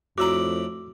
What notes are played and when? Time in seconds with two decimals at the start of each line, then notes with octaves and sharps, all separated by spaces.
0.18 F2 A2 D4 F#4 A#5 B5 D6 E6